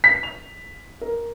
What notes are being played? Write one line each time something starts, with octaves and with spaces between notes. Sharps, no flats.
B6
F7
A#4